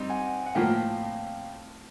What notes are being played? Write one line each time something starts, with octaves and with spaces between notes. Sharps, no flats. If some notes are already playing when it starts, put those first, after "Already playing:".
Already playing: G3 C4 D#4
F#5 G#5
F#5
A2 F3 A#3 F5 G5